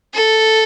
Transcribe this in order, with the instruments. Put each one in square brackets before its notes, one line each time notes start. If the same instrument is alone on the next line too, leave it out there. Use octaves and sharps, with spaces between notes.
[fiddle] A4